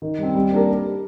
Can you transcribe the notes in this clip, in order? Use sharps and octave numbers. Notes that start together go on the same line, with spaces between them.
D#3
G3 C4
G3
A#3 D4 G4 A#4